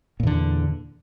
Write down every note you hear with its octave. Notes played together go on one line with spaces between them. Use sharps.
E2 A#2 D3